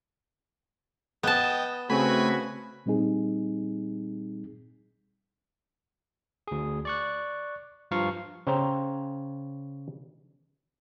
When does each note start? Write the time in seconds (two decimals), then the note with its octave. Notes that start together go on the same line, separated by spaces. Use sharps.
1.23 B3 D#5 G5 A5
1.90 C#3 A3 C4 F#4 B4 G#5 B5
2.86 A#2 G3 C4 D#4 G#4
6.48 D2 G#4
6.85 D5 C#6 F#6
7.91 G2 F3 F4 F5 A#5 C#6
8.47 C#3 C5 C#5 G5 A#5